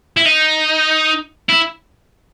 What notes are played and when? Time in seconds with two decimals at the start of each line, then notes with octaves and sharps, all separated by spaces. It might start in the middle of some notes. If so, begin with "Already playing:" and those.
0.17 E4
0.25 D#4
1.50 E4